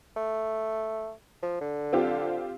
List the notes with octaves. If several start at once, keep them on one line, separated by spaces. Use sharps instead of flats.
A3
F3
D3
C4 F4 G4